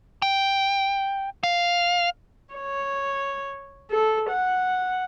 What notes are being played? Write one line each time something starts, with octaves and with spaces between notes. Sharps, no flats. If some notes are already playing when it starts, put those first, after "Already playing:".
G5
F5
C#5
A4
F#5